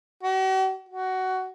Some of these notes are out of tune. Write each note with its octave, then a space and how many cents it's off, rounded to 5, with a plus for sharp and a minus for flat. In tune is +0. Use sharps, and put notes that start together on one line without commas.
F#4 +45
F#4 +15